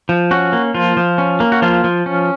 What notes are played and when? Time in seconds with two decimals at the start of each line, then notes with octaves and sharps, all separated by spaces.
0.09 F3
0.31 C#4 F#4
0.53 A#3
0.74 F3 F4
0.97 F3
1.18 C#4
1.40 A#3
1.52 F#4
1.62 F3 F4
1.84 F3
2.06 C#4